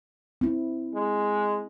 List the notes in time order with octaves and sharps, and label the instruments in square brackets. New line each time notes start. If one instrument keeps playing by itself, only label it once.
[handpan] C4 E4
[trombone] G#3